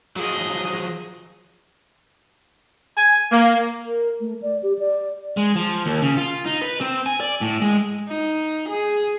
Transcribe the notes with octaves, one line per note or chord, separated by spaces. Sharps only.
F3 F#3 G#4 D#5
G#5
A#3
A#4
A3
D5
G4
D5
G#3
F3
D#2
C#3
F4
D#4
B4
C4
G#5
D5
A2
G#3
D#4
G#4